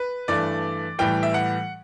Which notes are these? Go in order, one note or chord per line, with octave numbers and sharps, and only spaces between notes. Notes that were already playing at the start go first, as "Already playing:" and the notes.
Already playing: B4
G2 E3 A3 D5
A2 E3 G3 G5
E5
F#5